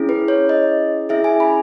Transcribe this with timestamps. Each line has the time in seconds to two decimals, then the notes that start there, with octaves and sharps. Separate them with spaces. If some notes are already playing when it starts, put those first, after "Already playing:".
Already playing: C#4 E4 G#4
0.09 B4
0.28 C#5
0.49 D#5
1.09 C#4 E4 G#4 E5
1.24 G#5
1.40 B5